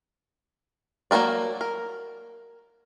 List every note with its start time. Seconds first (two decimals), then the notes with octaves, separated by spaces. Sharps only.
1.11 F#3 A#3 E4 A#4 D5
1.61 A#4